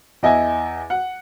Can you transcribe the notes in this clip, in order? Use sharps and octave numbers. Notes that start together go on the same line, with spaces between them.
E2 D#5 E5 G#5
F#5